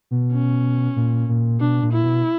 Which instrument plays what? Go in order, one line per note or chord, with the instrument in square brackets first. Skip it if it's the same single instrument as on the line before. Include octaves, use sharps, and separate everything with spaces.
[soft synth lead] B2
[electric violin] C#4
[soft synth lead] A#2
A#2
[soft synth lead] B2 [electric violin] D4
[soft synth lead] A#2
[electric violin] E4
[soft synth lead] B2